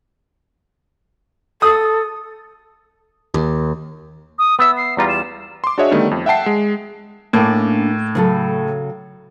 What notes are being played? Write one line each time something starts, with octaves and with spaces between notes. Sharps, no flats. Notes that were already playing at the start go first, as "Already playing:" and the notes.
A4 D#6
D#2
D#6
B3 E5 E6
C7
E2 G3 F4 A#5
E7
C6 D6
D4 F#4 G#4 C#5 D#5 E5
D3 D#3 G3 A3 B3
F2
E5 F#5 G5 A5 C7
G#3
A2 A#3 C#4 D4
C#3 F#3 A4